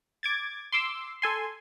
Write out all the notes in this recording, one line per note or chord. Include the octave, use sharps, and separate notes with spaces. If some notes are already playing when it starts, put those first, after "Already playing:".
D6 G#6 A6
C6 D6 E6
A4 G#5 C6